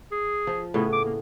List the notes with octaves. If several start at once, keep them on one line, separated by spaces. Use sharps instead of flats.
G#4
F3
A2 C#3 B3 E4
D6
A#3